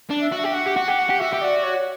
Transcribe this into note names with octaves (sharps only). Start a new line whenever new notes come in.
D4
E5
F#4
E5
G4
F#4 F#5
G4
F#4
G4
F#4
G4
F#4 E5
G4
F#4 D5
C#5